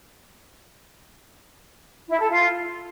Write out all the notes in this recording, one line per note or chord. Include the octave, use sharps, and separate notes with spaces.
E4
A4
F4